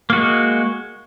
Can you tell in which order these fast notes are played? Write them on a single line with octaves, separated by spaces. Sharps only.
A#3 F#4 G#3